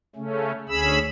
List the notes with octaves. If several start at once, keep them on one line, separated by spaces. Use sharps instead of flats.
C#3 A3 C#4
D2 C#4 G#4 B5 E6